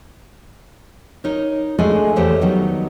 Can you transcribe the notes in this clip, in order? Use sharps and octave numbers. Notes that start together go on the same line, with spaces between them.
D#4 A#4 C#5
G#3 A3 D4 G#4 A4 F#5
E2 A3 G4 C5 C#5 F#5
D#3 F#3 G3 B3 D#4